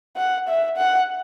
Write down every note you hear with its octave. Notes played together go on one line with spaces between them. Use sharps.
F#5
E5
F#5